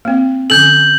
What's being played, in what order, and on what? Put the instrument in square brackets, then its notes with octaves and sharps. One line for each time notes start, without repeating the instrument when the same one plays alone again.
[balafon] A#3 C4
[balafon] D3 C#4 A4 [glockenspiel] G6 F#7